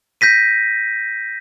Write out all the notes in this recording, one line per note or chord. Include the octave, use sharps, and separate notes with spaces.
G6 A#6 B6 D#7